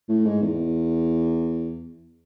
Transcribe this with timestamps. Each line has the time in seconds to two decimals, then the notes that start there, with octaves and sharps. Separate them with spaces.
0.09 A2
0.25 G#2
0.42 E2